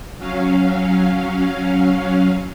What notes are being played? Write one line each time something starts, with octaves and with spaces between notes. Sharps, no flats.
F#3 C#4 F5